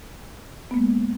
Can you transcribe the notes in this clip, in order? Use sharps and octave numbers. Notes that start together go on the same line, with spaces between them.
G#3 A#3 B3